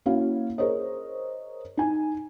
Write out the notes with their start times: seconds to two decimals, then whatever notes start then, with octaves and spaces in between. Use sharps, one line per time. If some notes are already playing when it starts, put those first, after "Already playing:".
0.06 A#3 C#4 E4 F#4 F5
0.58 G#4 A#4 C5 C#5 D#5
1.77 D#4 G#5